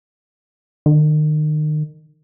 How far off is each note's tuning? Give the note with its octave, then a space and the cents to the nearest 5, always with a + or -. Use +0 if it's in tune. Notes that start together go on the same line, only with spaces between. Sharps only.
D#3 -35